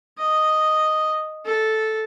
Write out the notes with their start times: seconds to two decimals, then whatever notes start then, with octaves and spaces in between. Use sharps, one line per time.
0.18 D#5
1.46 A4